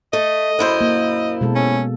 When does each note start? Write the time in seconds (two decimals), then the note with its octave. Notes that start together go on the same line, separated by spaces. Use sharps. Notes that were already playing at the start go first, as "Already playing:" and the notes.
0.13 A3 D#5
0.59 F#2 E4 C5
0.81 A#3
1.41 B2 G#3 A4
1.55 C#4